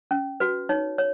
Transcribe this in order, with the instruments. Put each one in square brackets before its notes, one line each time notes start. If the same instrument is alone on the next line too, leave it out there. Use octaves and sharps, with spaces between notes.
[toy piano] C#4
F#4 B4
D#4 C#5
C#5